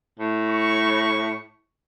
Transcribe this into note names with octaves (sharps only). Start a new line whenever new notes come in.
A2
C#6